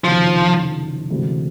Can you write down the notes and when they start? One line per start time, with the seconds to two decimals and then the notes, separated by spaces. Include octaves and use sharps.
0.04 F#1 F2 C3 D#3 F3 F#3
1.10 D2 C3 E3 G#3 C4